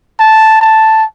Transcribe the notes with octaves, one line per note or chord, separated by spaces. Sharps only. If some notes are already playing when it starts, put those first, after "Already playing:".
A5
A5